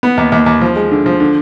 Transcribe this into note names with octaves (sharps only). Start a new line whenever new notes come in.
B3
D#2
D#2
D#2
F3
G#3
D3
F3
D3